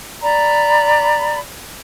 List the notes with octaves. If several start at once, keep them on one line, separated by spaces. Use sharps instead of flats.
D5 A#5 B5